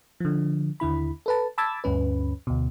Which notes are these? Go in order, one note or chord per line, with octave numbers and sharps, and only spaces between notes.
D3 F3
D#2 D3 E4 B5
A4 B4 A5
A5 B5 D6 E6 G#6 A6
D2 G2 C#4 B4
D2 B2